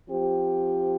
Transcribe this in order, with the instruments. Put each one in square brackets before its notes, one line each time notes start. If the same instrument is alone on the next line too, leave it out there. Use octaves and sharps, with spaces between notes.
[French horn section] F3 C4 G4